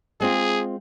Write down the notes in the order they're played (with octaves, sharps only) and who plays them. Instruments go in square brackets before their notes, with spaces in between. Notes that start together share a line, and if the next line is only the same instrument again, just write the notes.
[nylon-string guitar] G#3 C4 F4 [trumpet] G#4